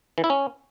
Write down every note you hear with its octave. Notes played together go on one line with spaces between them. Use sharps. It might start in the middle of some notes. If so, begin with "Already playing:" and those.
E3
E4
C#4